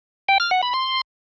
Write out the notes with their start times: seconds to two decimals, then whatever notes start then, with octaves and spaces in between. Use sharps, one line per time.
0.29 G5
0.40 F6
0.51 F#5
0.62 B5
0.74 C6